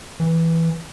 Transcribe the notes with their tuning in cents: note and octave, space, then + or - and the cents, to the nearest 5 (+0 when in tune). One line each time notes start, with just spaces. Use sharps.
E3 +0